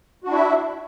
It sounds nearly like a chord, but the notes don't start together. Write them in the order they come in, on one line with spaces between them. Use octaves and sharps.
F#4 D4 E4 E5